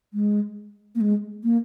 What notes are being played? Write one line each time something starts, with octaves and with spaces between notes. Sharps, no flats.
G#3
A#3
G#3
A#3